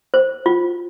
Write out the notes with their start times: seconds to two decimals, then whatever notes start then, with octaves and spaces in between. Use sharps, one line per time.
0.14 C5
0.46 F4